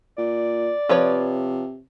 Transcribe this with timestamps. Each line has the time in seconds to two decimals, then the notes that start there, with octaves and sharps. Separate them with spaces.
0.18 A#2 D5
0.89 C3 F3 B4 C#5